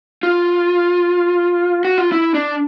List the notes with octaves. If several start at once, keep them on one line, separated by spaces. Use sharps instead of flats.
F4
F#4
F4
E4
D4